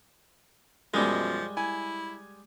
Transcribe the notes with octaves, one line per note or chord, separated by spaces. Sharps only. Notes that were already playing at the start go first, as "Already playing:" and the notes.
F#2 B2 F3 G3 G#3
E4 G#5